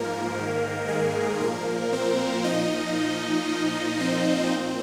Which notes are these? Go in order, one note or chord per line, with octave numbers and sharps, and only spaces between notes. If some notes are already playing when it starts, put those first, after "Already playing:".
Already playing: G#2 F3 A#3 A#4
G#2 D#3
G#3 G#4
A#2 F3 A#3 A#4
C4 C5
A#2 F3 D#4 D#5
A#2 F3
C4 C5
A#2